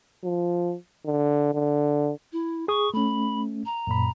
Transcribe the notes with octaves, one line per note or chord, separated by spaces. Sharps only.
F3
D3
D3
E4
G#4 C#6 D#6
A3 C#4 B5
A#5
F#2 A#2 B5